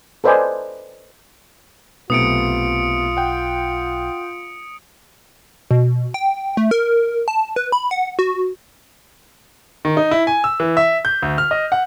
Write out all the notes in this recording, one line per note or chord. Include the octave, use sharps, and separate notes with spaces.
A4 B4 C5 D5 D#5 G#5
B1 C3 A3 B3 F4 D#6 C#7 D7
F#5 G5
B2
G5
A3
A#4
A5
B4
B5
F#5
F#4
D#3
D#4
E4
G#5
E6
E3
E5
G6
D2
F6
D#5
F#5